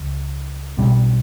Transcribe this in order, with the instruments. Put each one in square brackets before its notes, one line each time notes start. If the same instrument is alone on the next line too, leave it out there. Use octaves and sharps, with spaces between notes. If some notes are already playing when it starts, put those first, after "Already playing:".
Already playing: [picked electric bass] C#2
B1 B2 G3 C#4